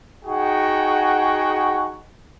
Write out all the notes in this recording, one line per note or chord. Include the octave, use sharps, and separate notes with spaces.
D#4 F#4 G#4 F#5 G5 C#6